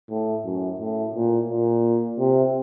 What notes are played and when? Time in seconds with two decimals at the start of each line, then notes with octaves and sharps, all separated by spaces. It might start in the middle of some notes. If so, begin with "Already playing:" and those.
0.10 A2
0.45 F#2
0.80 A2
1.15 A#2
1.50 A#2
2.19 C3